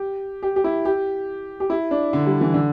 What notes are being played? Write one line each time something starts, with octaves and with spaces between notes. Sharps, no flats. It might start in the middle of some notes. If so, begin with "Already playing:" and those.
Already playing: G4
G4
G4
E4
G4
G4
E4
D4
D3
G3
E3
D3